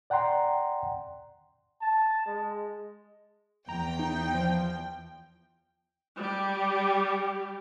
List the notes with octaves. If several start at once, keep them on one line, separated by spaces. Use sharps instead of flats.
D5 F#5 G5 A#5 C6
A5
G#3
E2 G5 A#5
D#4
F3
G3 G4